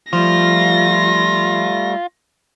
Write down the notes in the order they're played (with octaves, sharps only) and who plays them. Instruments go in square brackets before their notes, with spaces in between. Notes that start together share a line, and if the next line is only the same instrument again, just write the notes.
[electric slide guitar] F3 [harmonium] G3 A3 [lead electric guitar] F4 [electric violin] A#6